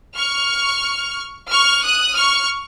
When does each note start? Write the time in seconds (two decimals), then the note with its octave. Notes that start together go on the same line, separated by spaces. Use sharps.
0.15 C#6 F6
1.49 C#6 F6
1.82 D#6 F#6
2.16 C#6 F6